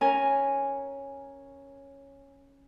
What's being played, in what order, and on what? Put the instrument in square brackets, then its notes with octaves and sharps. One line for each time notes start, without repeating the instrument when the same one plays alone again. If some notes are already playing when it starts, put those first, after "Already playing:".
[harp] C#4 A#4 G#5